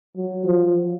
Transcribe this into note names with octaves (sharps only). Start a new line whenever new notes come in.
F#3
F3